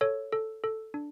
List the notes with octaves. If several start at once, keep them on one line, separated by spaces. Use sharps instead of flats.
A4 C#5
A4
A4
D4